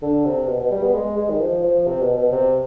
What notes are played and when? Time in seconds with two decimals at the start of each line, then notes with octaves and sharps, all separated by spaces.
0.02 D3
0.25 C3
0.48 B2
0.60 B2
0.71 G3
0.82 B3
0.94 G#3
1.17 G#3
1.30 D#3
1.40 F3
1.63 F3
1.86 C3
2.01 B2
2.17 B2
2.32 C3